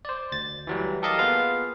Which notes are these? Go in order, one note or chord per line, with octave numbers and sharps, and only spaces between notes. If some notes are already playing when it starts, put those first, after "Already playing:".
C5 D5
D2 A6
E3 F#3 G3
G4 A4 A#4 D#5 F5 A5
A#3 B3 F4 G#4 B4 F5